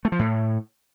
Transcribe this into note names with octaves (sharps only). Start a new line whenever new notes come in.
A3
F3
A2